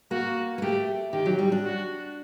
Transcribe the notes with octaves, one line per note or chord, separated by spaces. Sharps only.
A#3 F#4
A#3
A3 G4
D#3 G4
F#3
G3
D4
F#4